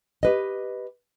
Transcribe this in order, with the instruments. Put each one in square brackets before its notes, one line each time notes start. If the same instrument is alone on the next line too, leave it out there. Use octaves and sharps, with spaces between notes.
[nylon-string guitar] G4 B4 D#5